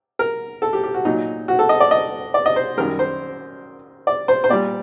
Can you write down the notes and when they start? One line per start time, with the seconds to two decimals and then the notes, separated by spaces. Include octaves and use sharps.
0.19 A#4
0.62 A4
0.73 G4
0.84 G4
0.94 F#4
1.05 A#2 F#3 D#4
1.48 F#4
1.59 A4
1.69 D#5
1.80 D5
1.91 D#5
2.34 D5
2.46 D#5
2.56 C5
2.77 F#2 D#3 G3 A#4
2.99 C5
4.07 D5
4.28 C5
4.44 C5
4.49 A#2 G3 D5